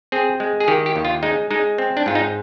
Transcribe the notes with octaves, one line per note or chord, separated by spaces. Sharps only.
C4 G#4
G#3
G#4
D#3 G4
G4
D#2
F4
G#3 D#4
G#3 D#4
C4
D4
G#2 F4
D#4